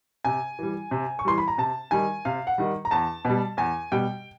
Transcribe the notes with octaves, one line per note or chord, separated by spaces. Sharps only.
C3 G#5
E3 G3
C3
C#6
E3 G3 C6
B5
A#5
C3 A5
D#3 G3 G#5
C3 F5
F#5
D#3 G3
A#5
E2 A5
B2 G3
E2 G#5
B2 G3 G5